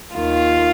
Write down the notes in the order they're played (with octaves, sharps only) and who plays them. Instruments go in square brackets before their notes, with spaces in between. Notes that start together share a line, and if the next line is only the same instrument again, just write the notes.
[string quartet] D#2 D#3 F4